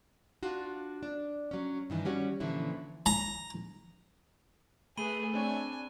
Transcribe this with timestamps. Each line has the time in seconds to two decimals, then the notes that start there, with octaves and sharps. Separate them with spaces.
0.43 D4 F4 F#4
1.03 D4
1.51 F#3 C#4
1.90 G2 D#3 E3
2.05 G3 C#4 F#4
2.40 A#2 D3 E3 F3 C#4 E4
3.06 A#5
4.97 A3 G#4 B4 B5 D#7 G7
5.34 C4 D4 C#5 G#5